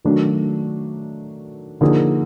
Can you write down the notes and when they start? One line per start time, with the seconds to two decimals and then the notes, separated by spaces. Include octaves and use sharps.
0.05 D#3 F#3 A3 D4
1.81 D3 F3 A#3 D#4 G#4